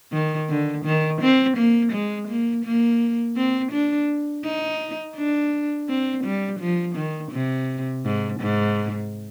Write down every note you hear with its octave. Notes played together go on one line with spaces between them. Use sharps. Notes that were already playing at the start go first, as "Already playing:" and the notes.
D#3
D3
D#3
C4
A#3
G#3
A#3
A#3
C4
D4
D#4
D4
C4
G3
F3
D#3
C3
G#2
G#2